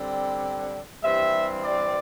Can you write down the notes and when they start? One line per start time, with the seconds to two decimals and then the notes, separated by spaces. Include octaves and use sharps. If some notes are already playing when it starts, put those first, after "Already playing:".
Already playing: D3 G3 C4
1.04 G2 E3 G3 C4 E5
1.64 D5